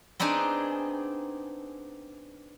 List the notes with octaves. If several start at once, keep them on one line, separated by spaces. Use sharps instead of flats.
B3 C4 D4 D#4 G#4